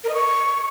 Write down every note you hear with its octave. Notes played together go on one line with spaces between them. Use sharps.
A#4
D#5
C#6